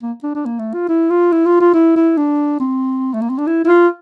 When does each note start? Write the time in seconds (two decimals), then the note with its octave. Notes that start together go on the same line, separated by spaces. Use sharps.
0.02 A#3
0.23 D4
0.35 D4
0.46 A#3
0.59 A3
0.74 F4
0.89 E4
1.10 F4
1.32 E4
1.46 F4
1.61 F4
1.74 E4
1.96 E4
2.17 D4
2.60 C4
3.13 A3
3.21 A#3
3.30 C4
3.38 D4
3.47 E4
3.65 E4
3.68 F4